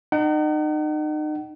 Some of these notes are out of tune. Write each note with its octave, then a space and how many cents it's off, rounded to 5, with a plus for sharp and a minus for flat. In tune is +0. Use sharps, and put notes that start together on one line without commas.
D#4 -35 F#5 +40